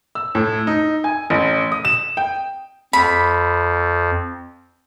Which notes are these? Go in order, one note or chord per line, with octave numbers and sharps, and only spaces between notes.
E6
A2
D#4
G#5
A1
D#6
E7
G5
F2 B5